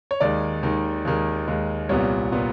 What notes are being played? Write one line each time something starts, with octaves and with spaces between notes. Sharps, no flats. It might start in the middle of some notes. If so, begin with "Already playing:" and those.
C#5
D#2 D#3 G#3 D5
D#2 D#3 G#3
D#2 D#3 G#3
D#2 D#3 G#3
C2 A#2 G3 B3 C#5
A#2 G3 B3